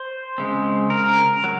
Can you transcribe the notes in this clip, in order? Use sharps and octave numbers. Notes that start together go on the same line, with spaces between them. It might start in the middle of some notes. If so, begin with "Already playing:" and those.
Already playing: C5
C#3 G#3 C4
A#4
F#3